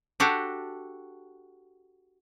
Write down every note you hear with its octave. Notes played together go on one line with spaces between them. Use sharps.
D4 F#4 G4 A4